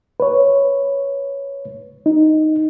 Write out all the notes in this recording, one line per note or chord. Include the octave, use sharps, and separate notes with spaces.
B4 C#5
D#4